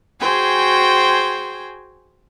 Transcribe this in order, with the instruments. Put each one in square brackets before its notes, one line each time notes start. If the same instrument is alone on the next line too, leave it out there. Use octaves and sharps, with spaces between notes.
[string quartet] F#4 G#4 C5 G5 G#5